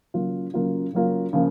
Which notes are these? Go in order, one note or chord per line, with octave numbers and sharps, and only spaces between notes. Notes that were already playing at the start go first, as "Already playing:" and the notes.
C#3 F#3 A#3 F4
C#3 F#3 A#3 F4
C#3 F#3 A#3 F4
C#3 F3 A#3